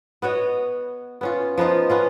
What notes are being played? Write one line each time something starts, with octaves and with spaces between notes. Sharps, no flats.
B3 F#4 C#5 D#5
B3 C#4 F4
F3 B3 D#4 F4
B3 C#4 F4